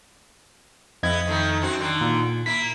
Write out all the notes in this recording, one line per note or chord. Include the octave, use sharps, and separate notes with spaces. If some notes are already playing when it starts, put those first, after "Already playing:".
F2 B3 E4 D#5 G#6
D#3 A3 E4
F#2 C4 F#4
D3 D#3
A#2
A#3 E4 B6